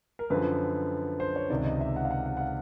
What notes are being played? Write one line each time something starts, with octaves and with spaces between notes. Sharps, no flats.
A#4
F#2 D3 F3 B4
C5
C#5
C#2 C3 D#3 D5
D#5
E5
F#5
F5
F#5
F#5
F#5
F5